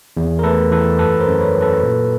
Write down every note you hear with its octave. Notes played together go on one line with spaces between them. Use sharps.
E2
A#4
A3 A4 B4
E3 A4 B4
F#2 A4 B4
A#4 C5
F#2
B4 C#5
F#3
A4 B4
A#2